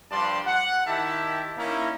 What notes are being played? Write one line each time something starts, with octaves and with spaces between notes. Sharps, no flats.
G2 F3 D4 D5 A5 C6
F#5
D#3 E4 G4 E5 A5
A#3 C#4 D#4 E4